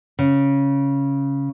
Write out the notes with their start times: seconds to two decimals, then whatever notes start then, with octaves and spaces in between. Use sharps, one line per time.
0.19 C#3